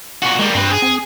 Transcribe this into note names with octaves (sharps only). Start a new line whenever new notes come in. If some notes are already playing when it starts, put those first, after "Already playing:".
A#2 F#4
G3 G#3 A#3
G2 C4 B4
G#4
C4